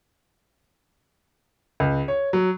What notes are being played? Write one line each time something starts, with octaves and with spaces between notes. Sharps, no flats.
C#2
C#5
F#3